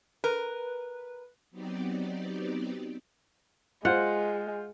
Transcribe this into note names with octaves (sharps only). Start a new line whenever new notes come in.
A#4 B4
F#3 B3 C4 D#4 G4 D5
G#3 F4 C5 F#5